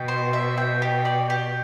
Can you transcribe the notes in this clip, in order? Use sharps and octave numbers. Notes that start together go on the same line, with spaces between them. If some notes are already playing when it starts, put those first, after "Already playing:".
Already playing: B2 G5
C5
E5
G5
G4
D5
G4